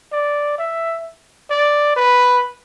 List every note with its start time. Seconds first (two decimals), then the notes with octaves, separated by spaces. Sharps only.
0.12 D5
0.58 E5
1.50 D5
1.96 B4